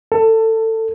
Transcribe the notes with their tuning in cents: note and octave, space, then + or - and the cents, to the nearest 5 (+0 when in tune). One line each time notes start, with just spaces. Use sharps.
A4 +20